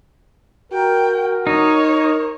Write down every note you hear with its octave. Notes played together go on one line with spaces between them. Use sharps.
F#4 A#4 G5
D#4 C#5